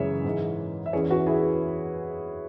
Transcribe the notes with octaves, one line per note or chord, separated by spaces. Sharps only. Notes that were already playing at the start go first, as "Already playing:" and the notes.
Already playing: F#2 C#3 E3 G#3 G#4 C#5 E5
G#2 E3 G#3
E5
E2 E3 C#4 G#4 C#5
F#4 B4
E4 G#4